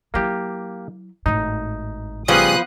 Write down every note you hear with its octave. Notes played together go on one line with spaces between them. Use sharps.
F#3 A#3 E4 G4
G#1 A2 D#4
C#3 F3 G3 B3 C#5 D#6 F#6 C7